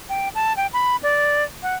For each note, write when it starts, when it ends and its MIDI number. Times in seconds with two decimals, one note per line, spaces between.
0.09 0.29 79
0.35 0.55 81
0.57 0.67 79
0.73 0.97 83
1.03 1.44 74
1.63 1.75 78